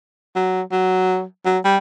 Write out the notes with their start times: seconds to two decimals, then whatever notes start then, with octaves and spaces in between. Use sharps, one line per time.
0.36 F#3
0.72 F#3
1.46 F#3
1.64 G3